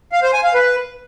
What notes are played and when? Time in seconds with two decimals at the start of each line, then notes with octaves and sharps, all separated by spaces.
0.12 F5
0.23 C5
0.33 G#5
0.44 F5
0.54 B4